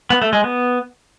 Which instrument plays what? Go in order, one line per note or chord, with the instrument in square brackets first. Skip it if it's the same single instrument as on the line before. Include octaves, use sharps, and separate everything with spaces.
[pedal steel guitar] B3
A3
G#3
B3